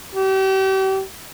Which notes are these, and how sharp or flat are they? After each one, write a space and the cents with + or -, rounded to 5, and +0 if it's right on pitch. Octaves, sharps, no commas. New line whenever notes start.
G4 -35